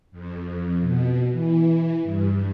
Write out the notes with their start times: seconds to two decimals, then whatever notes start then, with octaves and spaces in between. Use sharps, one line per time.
0.12 F2
0.81 B2
1.32 E3
2.03 G2